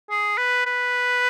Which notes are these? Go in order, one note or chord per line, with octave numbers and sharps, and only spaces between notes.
G#4
B4
B4